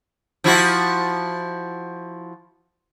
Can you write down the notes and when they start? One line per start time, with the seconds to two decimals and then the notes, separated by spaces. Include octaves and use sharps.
0.44 F3 E4 F#4